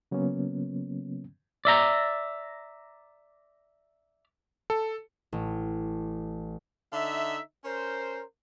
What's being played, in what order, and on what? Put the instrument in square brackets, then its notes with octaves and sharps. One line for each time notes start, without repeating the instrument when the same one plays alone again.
[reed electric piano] C#3 F#3 A#3 B3 C#4
[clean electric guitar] D5 E5 A#5
[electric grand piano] A4
[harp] A1
[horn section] D3 D#4 E5
C#4 A#4 C5